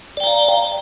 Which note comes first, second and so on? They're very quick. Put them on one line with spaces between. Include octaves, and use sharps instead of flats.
D5 G5 A#5 F5